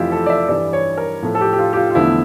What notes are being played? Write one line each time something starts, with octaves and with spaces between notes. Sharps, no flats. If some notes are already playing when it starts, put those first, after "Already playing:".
Already playing: F2 E3 A3 E4 F4 G4
A4
D5
E5
G2 E3 G3 D5
C#5
A#4
A2 F3 A3
A4
G4
G4
F4
G4
F4
F4
E2 D3 F3 A3 E4